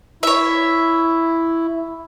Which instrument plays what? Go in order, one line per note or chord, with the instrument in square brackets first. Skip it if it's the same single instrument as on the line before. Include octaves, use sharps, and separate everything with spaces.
[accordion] E4 [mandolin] C#5 E5